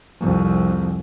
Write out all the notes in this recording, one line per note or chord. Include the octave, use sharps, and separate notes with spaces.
C2 F2